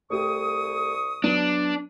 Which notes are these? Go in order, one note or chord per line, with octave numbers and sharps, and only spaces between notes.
C2 A3 G4 C#6 D#6
F#3 B3 D4 D#7